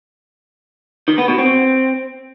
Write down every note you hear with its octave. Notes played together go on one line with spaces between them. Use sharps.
D#3
B3
B2
C4